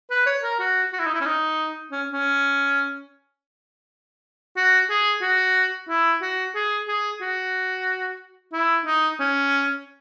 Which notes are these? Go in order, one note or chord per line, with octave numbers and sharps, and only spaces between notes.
B4
C#5
A#4
F#4
F#4
E4
D#4
E4
C#4
D#4
C#4
C#4
F#4
G#4
F#4
E4
F#4
G#4
G#4
F#4
E4
D#4
C#4